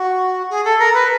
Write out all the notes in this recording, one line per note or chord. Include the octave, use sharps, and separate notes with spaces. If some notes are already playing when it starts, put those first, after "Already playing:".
Already playing: F#4
G#4
A4
A#4
B4